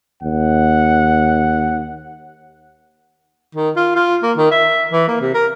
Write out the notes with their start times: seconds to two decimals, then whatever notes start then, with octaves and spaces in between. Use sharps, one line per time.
0.23 D#2 F#5
3.55 D#3
3.76 F4
3.96 F4
4.23 A#3
4.37 D#3
4.51 E5
4.92 E3
5.08 A#3
5.21 C3
5.34 A#4